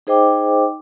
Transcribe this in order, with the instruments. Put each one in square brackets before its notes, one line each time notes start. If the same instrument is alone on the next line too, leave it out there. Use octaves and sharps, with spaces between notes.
[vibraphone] D#4 G#4 C5 D#5 G5 D6